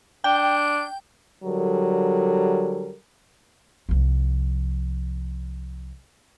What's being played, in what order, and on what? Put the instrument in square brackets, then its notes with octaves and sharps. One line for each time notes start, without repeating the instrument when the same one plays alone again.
[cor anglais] D4 [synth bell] G5
[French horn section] D3 F#3 G3 A4 A#4
[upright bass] C2 F3